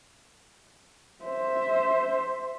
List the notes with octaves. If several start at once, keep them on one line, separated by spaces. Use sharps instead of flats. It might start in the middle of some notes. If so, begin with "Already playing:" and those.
C5 E5